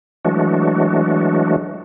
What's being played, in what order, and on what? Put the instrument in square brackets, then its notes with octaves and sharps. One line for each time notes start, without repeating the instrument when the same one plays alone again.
[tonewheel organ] E3 F#3 G#3 A3 D4 F#4